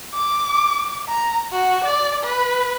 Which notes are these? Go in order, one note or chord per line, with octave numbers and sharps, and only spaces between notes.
D6
A#5
F#4
D5
B4